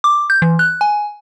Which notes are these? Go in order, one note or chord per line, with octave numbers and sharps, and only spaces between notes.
D6
G6
E3
F#6
G#5